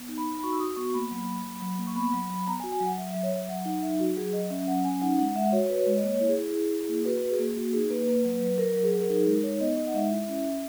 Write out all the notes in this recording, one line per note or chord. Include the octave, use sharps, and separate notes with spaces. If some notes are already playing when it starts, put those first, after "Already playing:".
Already playing: B3
D#4
B5
D#4
B5
F#4 C#6
E6
F#4 D#6
B3 C#6
A#3 B5
F#3
A#3
F#3
F#3
A#3
C#6
B3 B5
F#3
F#3
B3 A#5
G#5
F#4
G#5
F#3 F#5
F#3 E5
F#3 E5
C#5
F#3 E5
F#3 F#5
D#4 F#5
F#3 E5
F#3 F#4
F#3 G#4
F#3 D#5
C#4 E5
F#3 F#5
C#4 G#5
D#4 F#5
G#3 F#5
F#5
G#3 E5
F#4 C#5
C#5
F#4 B4
G#3 C#5
D#5
A#3 C#5
E4
G#4
E4
E4
E4
A#3
F#4 B4
F#4
G#4
A#3
A#3 F#4
D#4 G#4
A#3 B4
A#3
F#3
F#3
F#3 A#4
F#3
G#4
F#3
A#4
D#4 G#4
G#3 A#4
D#4 C#5
B3 D#5
D#4 D#5
F#5
G#3 E5
E4
C#4
C#4